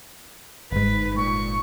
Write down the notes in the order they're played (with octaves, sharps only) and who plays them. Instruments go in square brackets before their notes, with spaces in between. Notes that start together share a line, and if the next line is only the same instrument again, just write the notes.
[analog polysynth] G1 G#2 [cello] B4
[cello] A#2 [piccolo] C#6